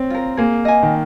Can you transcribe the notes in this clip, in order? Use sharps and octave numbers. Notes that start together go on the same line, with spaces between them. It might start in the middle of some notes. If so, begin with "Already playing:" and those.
Already playing: C4 C#4
F4 A#4
A#3 G#4
D#5 G#5
D#3